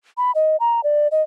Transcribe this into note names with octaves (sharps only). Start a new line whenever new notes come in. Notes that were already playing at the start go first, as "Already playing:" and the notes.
B5
D#5
A#5
D5
D#5